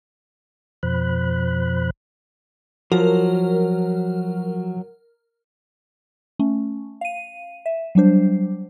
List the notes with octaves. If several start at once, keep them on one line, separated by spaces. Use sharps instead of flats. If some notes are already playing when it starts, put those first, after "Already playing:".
F2 B2 F3 C5 B5 F#6
F3 F#3 F#4 A#4
A3 C#4
F5 D#7
E5
F#3 G3 D4 C5